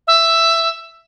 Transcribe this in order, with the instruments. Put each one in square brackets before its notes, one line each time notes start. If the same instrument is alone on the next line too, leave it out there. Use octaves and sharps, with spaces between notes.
[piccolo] E5